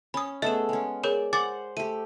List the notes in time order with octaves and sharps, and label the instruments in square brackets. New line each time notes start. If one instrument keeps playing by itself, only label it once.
[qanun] C#4 [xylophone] B5 D#6
[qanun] A3 B3 G#4 [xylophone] D#5 E7
[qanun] G#3 C#4
[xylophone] G#4 A#4 C#5 [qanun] D5
[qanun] C5 F#5 [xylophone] G#5 D6 A6
[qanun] A3 G4 [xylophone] D#7